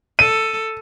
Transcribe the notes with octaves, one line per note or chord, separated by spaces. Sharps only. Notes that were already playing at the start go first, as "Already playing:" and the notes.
A4 D#7